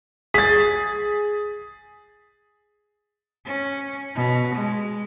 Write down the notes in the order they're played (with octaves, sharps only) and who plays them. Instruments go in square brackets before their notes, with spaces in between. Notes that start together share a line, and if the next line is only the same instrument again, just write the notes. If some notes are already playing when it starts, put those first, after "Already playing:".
[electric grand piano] G#4 [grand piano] A6 B6
[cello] C#4
B2
G#3